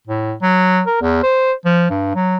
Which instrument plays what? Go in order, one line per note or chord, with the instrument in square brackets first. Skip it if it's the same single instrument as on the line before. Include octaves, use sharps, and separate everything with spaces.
[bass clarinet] A2
F#3
A#4
E2
C5
F3
G2
F#3